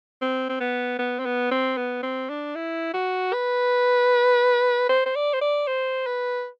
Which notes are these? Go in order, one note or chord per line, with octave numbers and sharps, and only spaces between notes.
C4
C4
B3
B3
C4
B3
C4
B3
C4
D4
E4
F#4
B4
C5
C5
D5
C5
D5
C5
B4